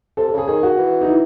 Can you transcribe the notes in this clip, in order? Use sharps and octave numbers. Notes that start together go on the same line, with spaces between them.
C3 A4
A4
C#3 G#4
D#3 G#4
F#4
E3
D#4
E4